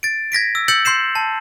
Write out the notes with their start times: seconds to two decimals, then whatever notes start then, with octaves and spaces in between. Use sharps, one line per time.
0.03 A6 D7
0.32 G#6 A#6 B6 D7
0.55 E6
0.68 E6 G6 A6 C#7 F#7
0.85 C6 G6 C7 E7
1.15 A5